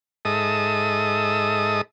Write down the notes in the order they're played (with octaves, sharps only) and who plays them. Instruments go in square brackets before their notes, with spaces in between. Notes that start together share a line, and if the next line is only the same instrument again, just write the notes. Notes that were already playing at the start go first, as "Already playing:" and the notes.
[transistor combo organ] G#2 A4 D#5 E5 D#6